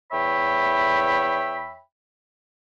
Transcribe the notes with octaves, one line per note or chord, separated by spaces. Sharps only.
E2 C#5 E5 G5 B5